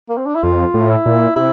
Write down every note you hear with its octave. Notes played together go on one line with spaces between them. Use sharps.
A#3
C4
D4
E4
F2 F4
A2
E4
A#2
C3 E4